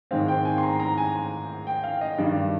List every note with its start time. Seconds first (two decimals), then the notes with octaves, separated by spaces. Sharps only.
0.11 G#2 D#3 G#3 C4 F5
0.28 G5
0.45 G#5
0.58 C6
0.63 A#5
0.80 A#5
0.98 G#5
1.67 G5
1.84 F5
2.01 D#5
2.18 G2 D#3 G3